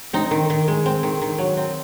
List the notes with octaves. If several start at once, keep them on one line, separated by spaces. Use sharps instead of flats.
C4 D#4
D#3
D#3
G#3
C4
D#3
D#3
F#3
C4